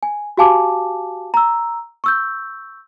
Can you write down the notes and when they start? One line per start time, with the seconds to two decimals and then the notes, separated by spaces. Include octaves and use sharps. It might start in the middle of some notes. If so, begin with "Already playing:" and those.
0.03 G#5
0.37 F#4 G4 F5 G#5 A5 D6
1.34 A#5 E6
2.04 C#6 E6 G6